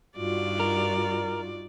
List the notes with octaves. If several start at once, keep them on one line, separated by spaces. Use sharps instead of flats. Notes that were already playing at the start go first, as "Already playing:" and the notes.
G2 D#4 F4 F#4 D5
A#4